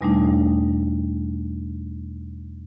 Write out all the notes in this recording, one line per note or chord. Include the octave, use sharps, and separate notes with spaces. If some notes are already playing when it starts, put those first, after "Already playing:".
E2 B2 G3 A3 D4 D#4